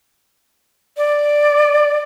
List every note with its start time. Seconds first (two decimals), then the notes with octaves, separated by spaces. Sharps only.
0.97 D5